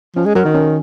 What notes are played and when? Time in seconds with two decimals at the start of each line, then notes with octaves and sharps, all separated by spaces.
0.16 F3 C#4
0.26 G#3
0.35 F#3 F#4 A#4
0.45 D#3
0.54 C#4